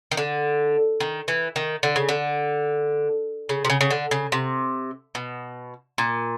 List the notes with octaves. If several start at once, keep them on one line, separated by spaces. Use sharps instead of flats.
D#3
D3
D#3
E3
D#3
D3
C#3
D3
C#3
C3
C#3
C#3
D3
C#3
C3
B2
A#2